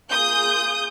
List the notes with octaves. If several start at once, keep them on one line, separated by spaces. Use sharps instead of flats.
A#3 F4 G#4 D#6 G6